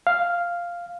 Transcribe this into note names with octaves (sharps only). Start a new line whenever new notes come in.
F5